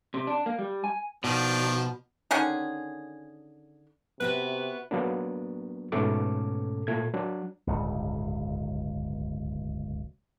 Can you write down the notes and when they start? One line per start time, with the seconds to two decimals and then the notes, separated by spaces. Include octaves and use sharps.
0.14 C3
0.27 D4
0.46 A#3
0.59 G3
0.84 G#5
1.24 B2 D#3 F3 D4
2.31 D3 D#3 C#4 G#4
4.20 C3 B3 F#4 B4 E5
4.91 F#3 A#3 B3 D4
5.92 G#2 B2 A3 C#4 A4 D6
6.87 A#2 A3 G#6
7.14 F#3 D4
7.67 D1 G1 C#2